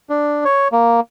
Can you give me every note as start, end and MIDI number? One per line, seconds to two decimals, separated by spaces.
0.10 0.44 62
0.45 0.68 73
0.72 1.00 58